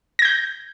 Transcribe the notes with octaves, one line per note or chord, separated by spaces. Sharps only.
G6 G#6 A#6